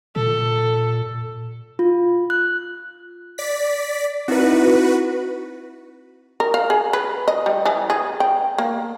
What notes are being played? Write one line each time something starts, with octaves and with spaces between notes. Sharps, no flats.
A#2 A4
F4
F#6
D5 B6
C4 D#4 E4 F#4 B4
A#4
F5
G#4
B4
D#5
G3
E3
G#4
G5
A#3